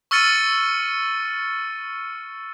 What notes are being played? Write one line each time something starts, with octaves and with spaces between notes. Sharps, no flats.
C#6 E6 F6 A6 C#7 D#7